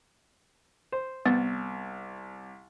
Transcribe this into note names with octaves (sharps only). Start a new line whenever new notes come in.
C5
C2 B3 A6